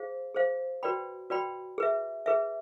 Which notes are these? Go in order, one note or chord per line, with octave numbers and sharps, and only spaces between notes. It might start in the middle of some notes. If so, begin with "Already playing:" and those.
Already playing: G#4 C5 F5
G#4 C5 F5
F#4 B4 D5 G5 B5
F#4 B4 D5 G5 B5
G#4 B4 E5
G#4 B4 E5